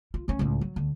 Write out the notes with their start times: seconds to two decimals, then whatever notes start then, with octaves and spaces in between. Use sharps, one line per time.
0.14 F4
0.28 A3 C#4
0.39 C#2 A2
0.61 F#3
0.76 D2